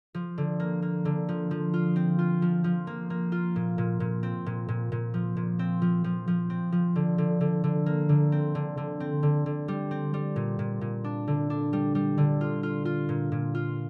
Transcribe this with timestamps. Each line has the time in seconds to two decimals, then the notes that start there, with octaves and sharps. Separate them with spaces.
0.14 F3
0.38 D3
0.60 A#3
0.82 A#3
1.05 D3
1.29 F3
1.51 F3
1.74 F4
1.96 C4
2.19 F4
2.42 F3
2.64 F3
2.87 A#3
3.10 A#3
3.32 F4
3.56 A#2
3.78 A#2
4.00 A#2
4.23 C4
4.46 A#2
4.68 A#2
4.92 A#2
5.14 F3
5.37 A#2
5.59 C4
5.82 F3
6.04 F3
6.28 F3
6.50 C4
6.72 F3
6.96 D3
7.18 D3
7.41 D3
7.64 D3
7.86 A#3
8.09 D3
8.32 C4
8.55 D3
8.77 D3
9.00 C4
9.23 D3
9.46 D3
9.68 G3
9.91 C4
10.14 G3
10.36 A#2
10.59 A#2
10.81 A#2
11.04 D4
11.27 D3
11.50 D4
11.73 G3
11.95 G3
12.18 D3
12.41 F4
12.63 F4
12.85 F4
13.09 A#2
13.32 A#2
13.55 F4